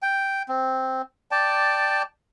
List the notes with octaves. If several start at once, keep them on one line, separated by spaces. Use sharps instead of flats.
G5
C4
D5 G5 A5